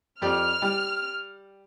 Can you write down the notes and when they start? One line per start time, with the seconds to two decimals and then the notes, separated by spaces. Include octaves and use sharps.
0.22 F2 G4 D5 F6
0.62 G3